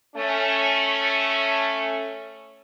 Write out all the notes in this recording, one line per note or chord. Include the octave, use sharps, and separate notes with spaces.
A3 C#4